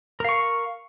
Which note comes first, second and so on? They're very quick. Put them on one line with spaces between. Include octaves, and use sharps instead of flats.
A#4 F5 C#6